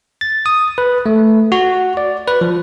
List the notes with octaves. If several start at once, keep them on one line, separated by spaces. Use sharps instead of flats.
A6
D#6
B4
A3
F#4
D5
B4
F3